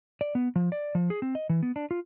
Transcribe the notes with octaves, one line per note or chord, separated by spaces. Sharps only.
D5
B3
F3
D5
F3
G#4
C4
D#5
E3
B3
D4
F4